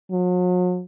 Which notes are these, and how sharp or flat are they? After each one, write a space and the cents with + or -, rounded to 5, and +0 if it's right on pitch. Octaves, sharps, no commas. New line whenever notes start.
F#3 -45